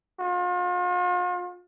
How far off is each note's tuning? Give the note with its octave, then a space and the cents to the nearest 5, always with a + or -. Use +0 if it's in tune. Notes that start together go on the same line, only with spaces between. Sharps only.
F4 +40